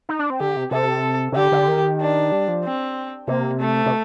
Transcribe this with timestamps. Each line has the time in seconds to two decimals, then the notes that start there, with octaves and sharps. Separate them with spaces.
0.09 D#4
0.19 D4
0.30 C4
0.40 D3 G4
0.57 C3
0.71 C3 A4
1.32 C3
1.36 D3 G4
1.52 D3
1.68 D#3
2.01 D4
2.32 G3
2.48 F3
2.64 C4
3.28 C3 A#3
3.59 A3
3.86 C3